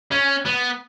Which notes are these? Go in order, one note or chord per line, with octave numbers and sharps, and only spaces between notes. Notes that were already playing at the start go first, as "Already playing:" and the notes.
C#4
B3